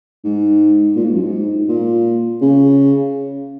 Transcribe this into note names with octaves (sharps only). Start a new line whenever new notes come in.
G#2
A#2
G#2
F#2
G#2
A#2
C#3